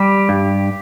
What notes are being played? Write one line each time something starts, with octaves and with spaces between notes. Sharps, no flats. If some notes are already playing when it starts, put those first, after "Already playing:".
Already playing: G3 G4
G2